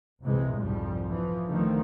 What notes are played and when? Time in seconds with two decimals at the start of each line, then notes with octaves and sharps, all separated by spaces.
0.23 C2 F#2 C3 E3 G#3
0.56 C2 F2 G#2 F3 G3
1.08 E3 F3
1.49 C2 D3 D#3 F3 A3 C4